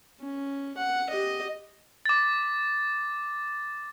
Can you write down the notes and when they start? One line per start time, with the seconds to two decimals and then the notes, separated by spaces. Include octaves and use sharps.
0.20 C#4
0.77 F#5
1.10 G4 D#5
2.06 D6 A6